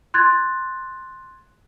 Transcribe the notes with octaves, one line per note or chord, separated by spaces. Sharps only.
C6 F#6 G#6 A6